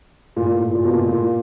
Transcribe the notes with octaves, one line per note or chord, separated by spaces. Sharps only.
A#2
A2
A#2
A#2
B2
A#2
A2
A#2